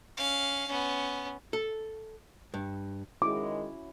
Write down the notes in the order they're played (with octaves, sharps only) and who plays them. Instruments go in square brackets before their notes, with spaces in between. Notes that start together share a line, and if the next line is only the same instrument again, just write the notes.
[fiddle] C#4 F5
B3 C#4
[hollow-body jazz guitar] A4
G2
[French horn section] D#3 G#3 [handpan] C#4 E4 F#4 [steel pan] D6